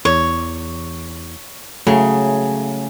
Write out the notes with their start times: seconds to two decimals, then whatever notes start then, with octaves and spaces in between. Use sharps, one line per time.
0.05 E2 C#5
1.87 C#3 F#3 A3 G#4